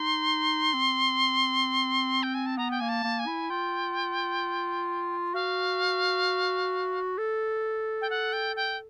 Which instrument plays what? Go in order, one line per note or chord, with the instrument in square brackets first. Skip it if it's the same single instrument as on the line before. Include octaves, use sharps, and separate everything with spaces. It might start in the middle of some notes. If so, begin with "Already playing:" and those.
Already playing: [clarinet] D#4 [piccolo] C6
[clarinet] C4
[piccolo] G5
G#5
A5
[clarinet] B3 [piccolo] A#5
[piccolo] G5
[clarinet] A#3 [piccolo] G#5
[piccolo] A5
[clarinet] A#3
[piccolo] G#5
[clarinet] E4
[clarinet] F4 [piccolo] G5
[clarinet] F#4 [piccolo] F5
[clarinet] A4
[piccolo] G5
F#5
G5
G5